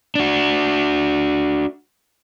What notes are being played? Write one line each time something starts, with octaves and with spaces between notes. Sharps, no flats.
D4 F#4